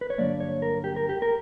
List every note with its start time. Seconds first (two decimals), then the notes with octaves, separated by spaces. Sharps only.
0.01 B4
0.10 C#5
0.18 G2 D3 F#3 A#3 D5
0.40 C#5
0.62 A#4
0.84 G4
0.96 A#4
1.09 G4
1.22 A#4